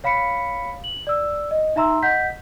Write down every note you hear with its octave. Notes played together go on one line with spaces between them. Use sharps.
C#5 F5 B5 B6 C#7
F#7
D5 E6
D#5
D#4 E5 A#5 C6 E6
D#5 F#5 G6 B6